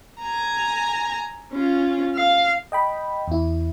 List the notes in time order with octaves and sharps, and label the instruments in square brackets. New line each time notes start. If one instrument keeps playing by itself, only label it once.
[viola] G#5 A#5
C#4 F4
F5
[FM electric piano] D#5 G5 B5
E2 E4